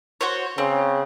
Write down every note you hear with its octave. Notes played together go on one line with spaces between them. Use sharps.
F#4 C5 C#5
C#3 C4